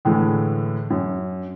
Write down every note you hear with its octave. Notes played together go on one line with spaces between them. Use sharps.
A2 D3 E3 G#3
F#2